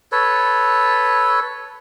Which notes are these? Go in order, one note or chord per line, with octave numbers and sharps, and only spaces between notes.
A4 B4 C#5